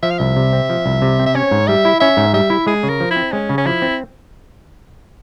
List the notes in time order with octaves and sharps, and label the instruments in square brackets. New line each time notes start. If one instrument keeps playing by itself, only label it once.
[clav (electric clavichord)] F3 [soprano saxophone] E5
[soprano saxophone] F5
[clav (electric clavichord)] C2 [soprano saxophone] E5
[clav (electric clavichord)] C3
C4
F3
C2
C3
C4
[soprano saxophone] E5
[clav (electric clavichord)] C#4 [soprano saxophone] C#5
[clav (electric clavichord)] G#2
[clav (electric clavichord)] G3 [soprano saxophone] E5
[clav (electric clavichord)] E4
[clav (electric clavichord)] C#4 [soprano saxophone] E5
[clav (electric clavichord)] G#2
[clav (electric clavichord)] G3 [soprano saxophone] E5
[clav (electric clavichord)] E4
[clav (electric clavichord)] G#3 [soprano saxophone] G#4
[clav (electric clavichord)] C#3
[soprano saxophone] A#4
[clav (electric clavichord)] F3
[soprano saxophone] E4
[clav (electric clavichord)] C4
[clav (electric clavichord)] G#3 [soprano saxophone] C#4
[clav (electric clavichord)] C#3
[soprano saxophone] C#4
[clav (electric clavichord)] F3 [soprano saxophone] E4
[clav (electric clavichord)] C4